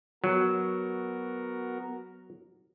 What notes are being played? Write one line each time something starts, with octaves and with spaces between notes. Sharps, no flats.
F#3 B3 F#4 A#4